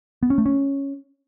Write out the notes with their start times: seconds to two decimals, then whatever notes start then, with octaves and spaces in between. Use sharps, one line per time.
0.23 B3
0.30 C#4
0.38 A3
0.46 C#4